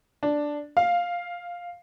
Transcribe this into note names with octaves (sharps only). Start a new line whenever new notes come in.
D4
F5